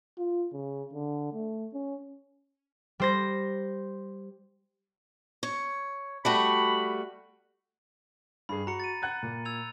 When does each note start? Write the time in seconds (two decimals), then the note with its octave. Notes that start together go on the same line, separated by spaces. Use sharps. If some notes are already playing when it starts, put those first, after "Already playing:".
0.18 F4
0.53 C#3
0.93 D3
1.33 A3
1.73 C#4
3.00 G3 C5 A#6
5.43 C#5
6.25 G3 A3 F#4 B5
8.49 G2 G#4 B5
8.67 F#4 A#5 C#7
8.80 A6 D#7
9.02 F#5 F#6 G#6
9.23 A#2
9.45 E6 G#6 F7